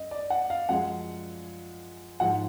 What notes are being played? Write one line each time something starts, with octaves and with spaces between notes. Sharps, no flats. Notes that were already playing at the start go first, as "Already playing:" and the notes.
Already playing: F#2 D#5
D5
F#5
F5
F#2 F3 G#3 F#5
G#2 F3 G#3 F#5